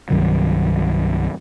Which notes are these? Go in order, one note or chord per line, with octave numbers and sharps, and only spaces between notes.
C2 G2 D#3 F#3